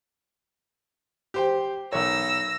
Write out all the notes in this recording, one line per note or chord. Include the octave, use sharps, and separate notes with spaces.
G4 C5 G5
B1 A#4 C#5 E6 A#6